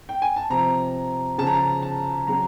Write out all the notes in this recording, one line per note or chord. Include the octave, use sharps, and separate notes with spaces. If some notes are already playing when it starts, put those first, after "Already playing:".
G5
G#5
A5
C3 F3 A#5
C#3 F3 A5
A#5
A5
A5
C#3 F#3 A#5